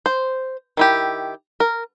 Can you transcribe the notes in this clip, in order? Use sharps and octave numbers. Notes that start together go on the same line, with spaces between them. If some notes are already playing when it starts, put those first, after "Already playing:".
C5
D#3 E4 G4
A#4